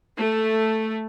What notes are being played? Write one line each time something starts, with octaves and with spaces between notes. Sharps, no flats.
A3